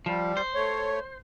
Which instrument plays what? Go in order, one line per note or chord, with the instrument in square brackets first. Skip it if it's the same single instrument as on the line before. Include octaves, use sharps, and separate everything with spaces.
[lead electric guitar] F3 [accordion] G3
[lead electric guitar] C5
[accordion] A3 C#5